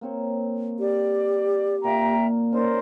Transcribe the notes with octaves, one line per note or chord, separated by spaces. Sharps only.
A#3 C4 C#5
G4 D5
A#2 A#3 E5 G5 A#5
C#4 D#4 A#4 C5 D5 A5